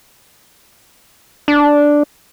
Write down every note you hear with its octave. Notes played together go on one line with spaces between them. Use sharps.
D4